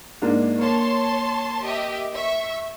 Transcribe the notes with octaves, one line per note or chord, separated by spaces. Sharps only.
G#2 A#3 D4
A#3 C#5 A5 C6
G4 D#5 E5
E5 C#6